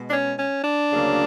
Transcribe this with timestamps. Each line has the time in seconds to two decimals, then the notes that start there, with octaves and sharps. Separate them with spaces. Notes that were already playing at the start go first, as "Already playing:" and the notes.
Already playing: B2 G#3
0.09 D4
0.13 C#4
0.39 C#4
0.64 D4
0.90 D2 C#3 F#3 A#3